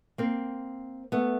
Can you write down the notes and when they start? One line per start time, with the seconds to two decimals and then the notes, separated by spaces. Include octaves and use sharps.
0.18 A#3 C4
1.12 A3 B3